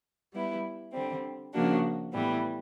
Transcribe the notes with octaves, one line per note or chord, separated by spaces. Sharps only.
G3 B3 E4
D3 G3 C4
C#3 F3 A#3 D4 F#4
A2 E3 G3 B3